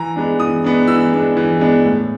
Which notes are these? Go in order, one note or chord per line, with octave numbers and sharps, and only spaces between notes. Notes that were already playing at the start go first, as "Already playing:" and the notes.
Already playing: E3 A#5
G#3 B3 D4
E3 D#6
G#3 B3 D4
E3 E6
G#3 B3 D4
E3
G#3 B3 D4
A2